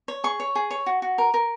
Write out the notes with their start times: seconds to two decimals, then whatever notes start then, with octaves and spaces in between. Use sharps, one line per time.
0.08 C#5
0.24 G#4 C#6
0.40 C#5
0.55 G#4
0.71 C#5
0.86 F#4
1.02 F#4
1.18 A#4
1.34 A#4